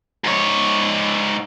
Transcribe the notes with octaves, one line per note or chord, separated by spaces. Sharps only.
G#2 C#5